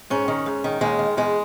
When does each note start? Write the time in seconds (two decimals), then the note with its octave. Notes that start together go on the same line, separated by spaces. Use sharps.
0.10 G#2 C#4
0.28 D#3
0.46 G#2
0.64 D#3
0.81 D#2 G#3
0.99 D#3
1.17 E2 G#3